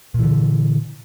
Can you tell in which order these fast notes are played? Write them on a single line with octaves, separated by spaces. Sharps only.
A#2 E3 D3